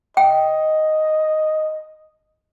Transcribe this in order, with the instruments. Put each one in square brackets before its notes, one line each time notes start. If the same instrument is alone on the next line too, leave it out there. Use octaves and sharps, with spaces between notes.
[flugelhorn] D#5 [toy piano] G5